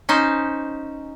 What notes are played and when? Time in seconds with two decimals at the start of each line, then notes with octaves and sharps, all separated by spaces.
0.09 C#4 D#4 C5